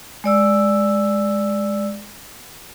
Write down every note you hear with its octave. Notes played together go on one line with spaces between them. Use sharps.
G#3 D5 E6